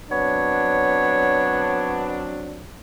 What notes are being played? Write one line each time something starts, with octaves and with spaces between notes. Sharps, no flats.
F#3 B3 C4 D4 C#5